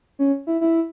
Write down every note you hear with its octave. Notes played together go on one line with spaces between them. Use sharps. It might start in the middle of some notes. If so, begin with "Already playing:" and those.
C#4
E4
E4